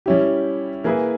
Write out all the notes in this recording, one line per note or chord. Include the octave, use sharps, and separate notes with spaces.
G3 C#4 E4 G4
E3 A#3 E4 G#4 B4